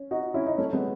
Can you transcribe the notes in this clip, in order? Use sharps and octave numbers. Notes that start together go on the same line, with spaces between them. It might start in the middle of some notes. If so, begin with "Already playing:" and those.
Already playing: C#4
D#4 F#4
C#4 E4
D#4
A3 C#4
G#3 B3